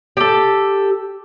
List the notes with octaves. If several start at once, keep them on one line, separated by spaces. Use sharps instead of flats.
G4 A4